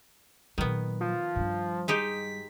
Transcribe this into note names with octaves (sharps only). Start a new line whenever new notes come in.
A#2 D#3 F#3 B3
F3
G2 G3
G#3 D#4 G4 B6